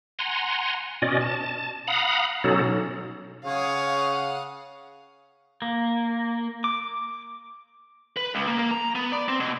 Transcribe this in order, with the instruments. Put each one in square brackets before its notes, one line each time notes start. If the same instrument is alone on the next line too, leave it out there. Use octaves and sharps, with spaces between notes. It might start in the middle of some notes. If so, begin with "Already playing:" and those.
[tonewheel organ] F#5 G#5 A#5 C6
B2 C#4 D5 D#5
A5
F5 F#5 A#5 B5 D#6
B2 F#3 C#4 D#4 A4
[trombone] C#3 [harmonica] C#5 [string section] F5 F#5 D#6
[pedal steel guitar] A#3
D6
[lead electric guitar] B4
C#2
A#3
A#3
A#5
B3
D5
C4
B2